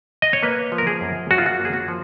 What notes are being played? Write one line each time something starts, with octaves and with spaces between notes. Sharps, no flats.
D#5
C#5
A#3 B4
F3
A#4
G#4
F#2
F#2 F#4
F4
F#4
A#3
G#4
F#4
F3